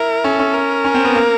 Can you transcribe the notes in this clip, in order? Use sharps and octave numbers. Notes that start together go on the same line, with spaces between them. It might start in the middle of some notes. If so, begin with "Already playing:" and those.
Already playing: E4 A#4
C#4 A4
C#4
A#4
C#4
C4
B3
A#3